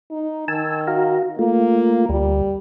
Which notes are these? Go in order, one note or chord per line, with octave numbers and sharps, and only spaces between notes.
D#4
D#3 G#5 A5 E6
F#4 F5 A#5
A3 A#3 F4
D2 G3